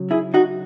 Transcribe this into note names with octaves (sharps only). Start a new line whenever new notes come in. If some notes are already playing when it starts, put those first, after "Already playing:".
Already playing: C#3 F#3
E4 G#4
D#4 F#4